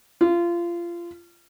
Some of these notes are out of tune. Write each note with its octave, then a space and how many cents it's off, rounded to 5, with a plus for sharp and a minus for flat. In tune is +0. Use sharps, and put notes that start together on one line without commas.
F4 -25